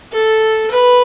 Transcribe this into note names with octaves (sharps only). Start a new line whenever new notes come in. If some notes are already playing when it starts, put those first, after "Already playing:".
A4
B4